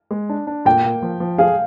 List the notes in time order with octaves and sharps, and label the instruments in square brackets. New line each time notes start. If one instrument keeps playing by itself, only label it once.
[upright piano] G#3
D4
D4
[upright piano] A#2 [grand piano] G5
[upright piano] A#3
F3
F3
[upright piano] G#4 [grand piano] F5